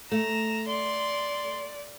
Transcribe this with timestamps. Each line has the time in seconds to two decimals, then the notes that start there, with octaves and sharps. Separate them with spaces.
0.12 A3 A#5 E7
0.68 D5 C6